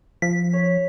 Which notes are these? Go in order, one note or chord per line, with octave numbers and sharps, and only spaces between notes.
F3 B6
C#5